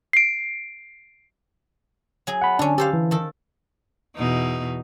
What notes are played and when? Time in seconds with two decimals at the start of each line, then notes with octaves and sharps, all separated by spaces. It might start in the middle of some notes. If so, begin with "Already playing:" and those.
0.13 C7 D7
2.27 F#3 G#4
2.42 F#5 B5
2.59 D3 C#4 D4
2.78 G4 A4 C5 F5
2.93 E3
3.11 D#3 A4
4.17 E2 B2 D#4